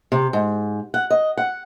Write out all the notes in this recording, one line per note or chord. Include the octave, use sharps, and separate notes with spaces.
C3
G#2
F#5
D#5
F#5